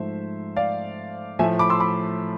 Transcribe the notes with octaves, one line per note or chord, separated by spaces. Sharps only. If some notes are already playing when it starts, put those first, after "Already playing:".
Already playing: G#2 F3 A3 C5 E5
D5 F5
A2 F3 A3 E5 G#5
B5 D6
C6 E6
B5 D6